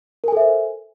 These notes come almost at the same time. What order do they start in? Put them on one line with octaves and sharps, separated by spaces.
A#4 G#5 A4 E5 C5